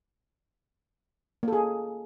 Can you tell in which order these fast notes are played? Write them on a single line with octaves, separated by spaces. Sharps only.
A#3 A4 G#4